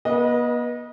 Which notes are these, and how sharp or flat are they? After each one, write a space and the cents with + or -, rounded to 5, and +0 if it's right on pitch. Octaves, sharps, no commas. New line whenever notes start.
B3 -45 B4 -25 D#5 +0